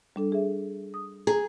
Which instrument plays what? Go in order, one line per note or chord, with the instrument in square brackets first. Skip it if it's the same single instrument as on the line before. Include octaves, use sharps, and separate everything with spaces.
[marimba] G3 D4 A4
G#4 E5
D#6
[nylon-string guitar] G#4 [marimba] A#5